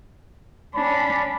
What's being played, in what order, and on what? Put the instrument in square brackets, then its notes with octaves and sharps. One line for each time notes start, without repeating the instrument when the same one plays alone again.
[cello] C#4 D4 [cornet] B5